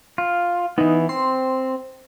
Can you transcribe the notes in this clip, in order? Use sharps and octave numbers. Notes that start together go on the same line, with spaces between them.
F4
E3 B3 D#4
C4 C6